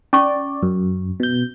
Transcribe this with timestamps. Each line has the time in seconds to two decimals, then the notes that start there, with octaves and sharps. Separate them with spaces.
0.13 C#4 D5 C#6
0.63 F#2
1.20 B2 G6